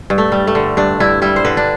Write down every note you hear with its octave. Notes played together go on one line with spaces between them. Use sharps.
G2
A3
G3
A3
D3
G2 D4
G2 E4
G3 E4
C5
D3 B4
D4